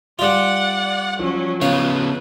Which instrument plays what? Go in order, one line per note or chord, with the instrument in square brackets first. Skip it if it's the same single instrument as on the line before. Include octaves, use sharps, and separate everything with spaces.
[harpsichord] G3 F4 [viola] D5 F#5
[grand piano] F3 [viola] F#3 C#4
[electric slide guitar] C#3 B3 [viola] B4 [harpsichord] C#5 F5